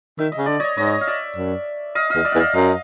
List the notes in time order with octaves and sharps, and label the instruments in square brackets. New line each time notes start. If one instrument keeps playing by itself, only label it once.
[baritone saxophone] D#3 [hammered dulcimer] E5
[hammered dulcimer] D#5
[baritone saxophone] C#3
[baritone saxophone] D3 [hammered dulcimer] D5
[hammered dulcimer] C#5 D#5
[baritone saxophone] G#2 [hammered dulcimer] C#5 D#5
[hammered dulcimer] F5
D5 E5
[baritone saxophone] F#2
[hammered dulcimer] D#5 F5
[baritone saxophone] E2 [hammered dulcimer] D#5 F5
[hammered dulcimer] D5 E5
[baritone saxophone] E2 [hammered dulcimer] F#5
[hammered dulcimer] D#5 F5
[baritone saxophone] F#2 [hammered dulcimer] D#5 F5